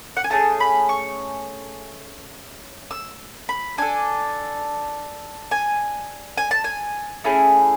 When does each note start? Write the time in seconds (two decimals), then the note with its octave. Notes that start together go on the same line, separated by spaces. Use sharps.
0.17 F#5
0.24 G#5
0.30 A3 C#4 G#4 A5
0.60 B5
0.89 C#6
2.91 E6
3.49 B5
3.78 D4 A4 G#5
5.51 G#5
6.38 G#5
6.51 A5
6.64 G#5
7.24 A3 C#4 E4 G#4